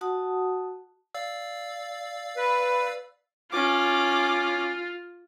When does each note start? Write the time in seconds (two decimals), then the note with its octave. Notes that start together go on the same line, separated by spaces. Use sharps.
0.01 F#4 F#5 A5 D#6
1.14 D5 F5 E6
2.37 B4
3.52 C#4 F4 D6